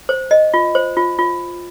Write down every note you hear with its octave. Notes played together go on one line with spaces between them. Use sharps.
C5
D#5
F4
C5
F4
F4